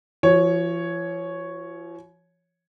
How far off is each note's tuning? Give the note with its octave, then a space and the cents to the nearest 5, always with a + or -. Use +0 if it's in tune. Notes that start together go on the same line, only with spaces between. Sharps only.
F3 -45 F#4 +0 C#5 +0